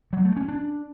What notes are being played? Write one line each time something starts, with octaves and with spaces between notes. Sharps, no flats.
F#3
A3
C#4
D4